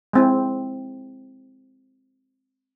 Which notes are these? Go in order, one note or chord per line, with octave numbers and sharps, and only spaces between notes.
G#3 C4 E4